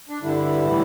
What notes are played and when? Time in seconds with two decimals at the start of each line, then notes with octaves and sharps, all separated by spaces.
0.09 D4
0.23 G2 D3 G3 E4
0.66 A2 E3 G3